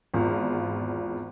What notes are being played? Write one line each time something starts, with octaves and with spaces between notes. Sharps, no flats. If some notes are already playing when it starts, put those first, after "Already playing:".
G#1 E2 F4